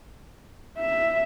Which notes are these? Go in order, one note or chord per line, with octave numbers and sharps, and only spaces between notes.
E5